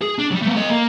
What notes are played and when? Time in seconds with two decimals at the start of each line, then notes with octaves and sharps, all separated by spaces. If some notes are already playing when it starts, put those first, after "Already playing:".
0.01 G#4
0.18 D4
0.31 F#3 G3
0.42 A3 B3
0.56 A4 D#5
0.70 A#3